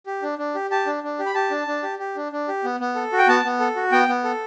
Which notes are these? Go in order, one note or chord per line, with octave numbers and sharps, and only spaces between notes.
G4
D4
D4
G4
G4 A5
D4
D4
G4
B5
G4 A5
D4
D4
G4
G4
D4
D4
G4
B3
B3
A4
F#4
G5
B3 A5
B3
A4
F#4
B3 G5
B3
A4